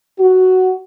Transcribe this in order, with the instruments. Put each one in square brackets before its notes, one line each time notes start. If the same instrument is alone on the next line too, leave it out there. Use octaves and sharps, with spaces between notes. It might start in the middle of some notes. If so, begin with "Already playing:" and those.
[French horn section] F#4